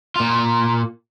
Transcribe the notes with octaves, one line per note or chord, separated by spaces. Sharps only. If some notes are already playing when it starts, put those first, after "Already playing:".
A#2 F4